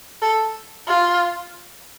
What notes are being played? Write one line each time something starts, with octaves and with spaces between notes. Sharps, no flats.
A4
F4